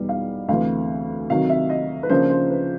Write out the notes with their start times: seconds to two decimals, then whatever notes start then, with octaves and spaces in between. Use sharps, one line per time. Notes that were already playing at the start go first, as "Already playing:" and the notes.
Already playing: E2 B2 G3 B3 D#4
0.09 F5
0.49 D2 C3 E3 F5
1.30 C3 D#3 F#3 F5
1.49 E5
1.70 D#5
2.03 B4
2.09 C#3 F3 A#3 D4 F4 C5
2.30 C5
2.50 B4